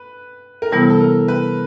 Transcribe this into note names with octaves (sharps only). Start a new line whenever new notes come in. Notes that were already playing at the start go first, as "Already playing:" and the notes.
Already playing: B4
A#4
C3 E3 G3 B3 E4 A4
A4
A#4
B4